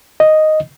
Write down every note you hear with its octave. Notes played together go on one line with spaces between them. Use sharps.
D#5